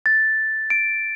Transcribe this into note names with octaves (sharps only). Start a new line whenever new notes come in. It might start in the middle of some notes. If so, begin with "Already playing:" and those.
A6
D7